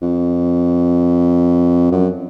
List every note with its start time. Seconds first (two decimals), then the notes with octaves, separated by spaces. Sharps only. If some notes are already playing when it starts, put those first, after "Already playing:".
0.02 F2
1.91 F#2